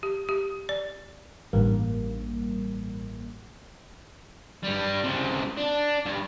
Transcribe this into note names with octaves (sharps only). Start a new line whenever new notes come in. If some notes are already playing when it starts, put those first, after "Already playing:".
G4
G4
D5
A1 G2 A#3
G2 G3
C#2 C3
D4
G2